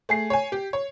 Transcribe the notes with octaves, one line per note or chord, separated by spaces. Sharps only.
A3 G#4 C7
C#5 G#5
G4
C#5